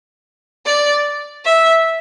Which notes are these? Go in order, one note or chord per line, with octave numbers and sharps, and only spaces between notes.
D5
E5